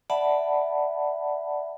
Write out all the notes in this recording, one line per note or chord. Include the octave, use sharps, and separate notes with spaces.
D5 E5 F#5 A5 B5